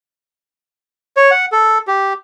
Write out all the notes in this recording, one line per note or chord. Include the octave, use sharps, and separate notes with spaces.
C#5
F#5
A4
G4